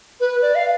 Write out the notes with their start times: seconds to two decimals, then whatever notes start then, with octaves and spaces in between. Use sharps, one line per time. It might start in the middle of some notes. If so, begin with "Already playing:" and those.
0.20 B4
0.42 D5
0.55 F5